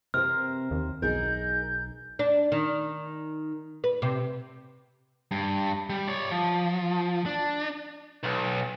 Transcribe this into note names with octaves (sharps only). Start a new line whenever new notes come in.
C3 C4 A#4 C5 F6
D#2
B1 D#4 G#4 A#4 G6
D4
D#3
B4
C3
G2
G3
C#5 D5
F3
D4
B1